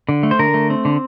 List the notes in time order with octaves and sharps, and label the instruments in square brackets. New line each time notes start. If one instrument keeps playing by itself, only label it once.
[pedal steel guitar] D3
A3
C5
D3 A#4
A3
C4
D3